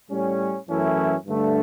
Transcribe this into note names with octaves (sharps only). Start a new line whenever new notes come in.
A2 G3 C#4
F#2 E3 A3 C#4 E4
G2 D3 A3 D4